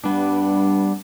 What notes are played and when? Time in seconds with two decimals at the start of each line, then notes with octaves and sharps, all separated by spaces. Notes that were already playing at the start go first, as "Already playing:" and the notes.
0.04 G2 G3 B3 D4